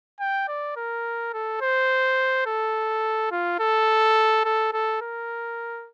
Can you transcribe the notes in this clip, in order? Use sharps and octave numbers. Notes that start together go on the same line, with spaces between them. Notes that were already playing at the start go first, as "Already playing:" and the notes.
G5
D5
A#4
A4
C5
A4
F4
A4
A4
A4
A#4